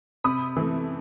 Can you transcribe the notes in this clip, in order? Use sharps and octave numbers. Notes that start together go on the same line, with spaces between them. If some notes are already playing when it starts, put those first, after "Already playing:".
C3 B5 D#6
E3 A3